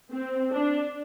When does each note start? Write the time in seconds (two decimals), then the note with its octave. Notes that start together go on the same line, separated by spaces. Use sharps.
0.11 C4
0.52 D4